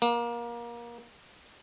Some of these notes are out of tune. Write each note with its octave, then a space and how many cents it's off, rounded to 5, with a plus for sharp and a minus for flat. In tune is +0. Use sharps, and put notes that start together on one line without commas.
A#3 +25